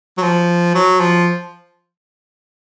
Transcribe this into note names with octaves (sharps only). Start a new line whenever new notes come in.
F#3
F3
F#3
F3